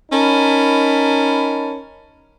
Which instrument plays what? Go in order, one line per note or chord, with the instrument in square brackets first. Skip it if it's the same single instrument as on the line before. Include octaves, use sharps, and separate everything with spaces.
[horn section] C#4 D#4 A#4 A5 B5